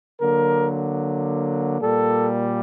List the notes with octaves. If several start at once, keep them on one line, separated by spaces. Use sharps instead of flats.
D3 F#3 A#3 A#4
A#2 G3 A#3 A4